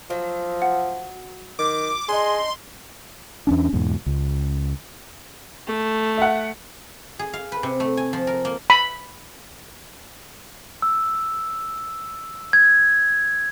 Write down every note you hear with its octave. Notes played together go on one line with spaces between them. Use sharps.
F3 F#3
F#5
D#3 D6
D4 D#4 G#4 C6
E2 C#4 D4
E2 G#2 B2
C#2
A3
E5 F#5
G#4
F5
B4
C3
A3
G#5
F3
A#4
A#3
B5
E6
G#6